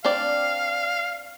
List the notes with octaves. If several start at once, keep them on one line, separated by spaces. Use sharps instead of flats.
C4 D4 D5 F5